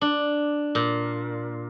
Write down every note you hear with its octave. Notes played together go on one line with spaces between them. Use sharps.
D4
A#2